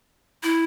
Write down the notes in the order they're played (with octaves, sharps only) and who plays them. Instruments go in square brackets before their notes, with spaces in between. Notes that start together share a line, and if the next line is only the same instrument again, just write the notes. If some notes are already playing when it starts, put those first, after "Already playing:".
[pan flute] E4